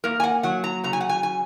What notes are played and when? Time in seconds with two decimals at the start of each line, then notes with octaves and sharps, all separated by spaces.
0.04 A#3 A#4
0.20 G#5
0.24 F#5
0.43 F#3 F#5
0.64 A#5
0.84 C#3 A#5
0.93 G#5
1.01 F#5
1.09 G#5
1.23 G#5